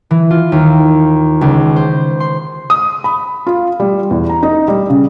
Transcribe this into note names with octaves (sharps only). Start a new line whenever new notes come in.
E3
F4
D#2
C#2
C5
C6
D#6
B5
F4
G3
E2
A#5
D#4
G3
C#3